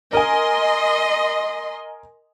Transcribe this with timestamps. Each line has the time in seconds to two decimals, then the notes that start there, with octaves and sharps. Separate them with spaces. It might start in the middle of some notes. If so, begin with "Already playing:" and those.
0.13 A#4 D#5 G#5 C6